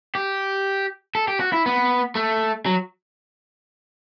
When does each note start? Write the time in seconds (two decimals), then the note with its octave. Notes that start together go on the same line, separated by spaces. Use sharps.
0.15 G4
1.15 A4
1.28 G4
1.40 F#4
1.53 E4
1.66 B3
2.15 A3
2.66 F#3